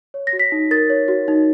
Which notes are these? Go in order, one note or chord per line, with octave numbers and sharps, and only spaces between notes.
C#5
A#6
F#4
B6
D#4
A#4 A6
C#5
F#4
D#4